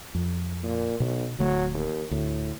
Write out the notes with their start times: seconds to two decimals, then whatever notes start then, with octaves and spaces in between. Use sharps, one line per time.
0.15 F2
0.63 A#2
1.00 B1 B2
1.39 D1 D3 F#3 A3
1.74 D#2
2.11 D2 A2